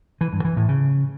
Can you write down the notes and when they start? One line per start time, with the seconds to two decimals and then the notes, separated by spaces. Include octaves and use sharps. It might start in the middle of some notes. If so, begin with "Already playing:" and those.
0.21 E3
0.33 G2
0.45 E3
0.56 A2
0.68 C#3